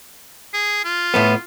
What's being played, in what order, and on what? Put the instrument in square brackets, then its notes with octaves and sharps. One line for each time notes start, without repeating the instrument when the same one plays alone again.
[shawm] G#4
F4
[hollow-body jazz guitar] A2 A3 B3